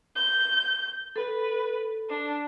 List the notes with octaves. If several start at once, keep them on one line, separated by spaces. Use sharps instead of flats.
G6
A4 B4
D4